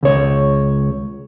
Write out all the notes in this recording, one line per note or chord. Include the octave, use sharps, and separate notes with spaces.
C#2 C#5